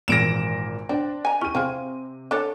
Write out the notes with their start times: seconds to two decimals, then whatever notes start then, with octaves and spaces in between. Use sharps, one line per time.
0.08 G#1 A#2 E3 A#6 D7 E7
0.89 C4 D4
1.25 G#5 A#5
1.41 C#4 E4 G4 D#7
1.55 C3 C4 F4 G#4
2.31 D4 A4 C#5